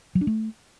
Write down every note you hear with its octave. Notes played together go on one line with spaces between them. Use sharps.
F#3
D4
A3